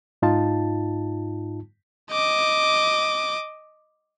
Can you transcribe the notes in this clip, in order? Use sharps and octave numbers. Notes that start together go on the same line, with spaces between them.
G#2 D#4 F4 A5
D#5 D6